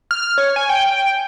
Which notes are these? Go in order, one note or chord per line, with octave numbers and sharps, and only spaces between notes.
F6
C#5
G#5
G5